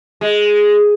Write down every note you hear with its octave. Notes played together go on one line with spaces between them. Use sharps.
G#3